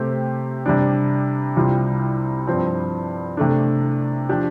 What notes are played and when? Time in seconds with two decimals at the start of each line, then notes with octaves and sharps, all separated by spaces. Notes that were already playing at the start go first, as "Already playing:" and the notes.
Already playing: C3 A3 C4 G4
0.66 C3 G3 D4
1.57 C2 C3 G3 F4
2.47 G2 F3 C4
3.37 C3 A3 D4
4.29 F3 D4 G4